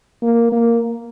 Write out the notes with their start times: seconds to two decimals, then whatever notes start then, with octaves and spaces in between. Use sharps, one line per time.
0.23 A#3
0.52 A#3